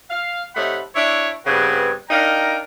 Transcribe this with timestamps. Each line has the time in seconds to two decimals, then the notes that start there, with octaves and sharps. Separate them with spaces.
0.10 F5
0.56 C3 A3 D#4 C#5 F#5 B5
0.95 D4 E4 C#5
1.46 G2 C#3 B3 C4 F#4 B4
2.10 D4 D#4 A#4 F5 G5 A#5